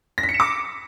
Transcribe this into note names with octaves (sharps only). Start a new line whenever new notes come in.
A#6
B6
C#7
E7
D6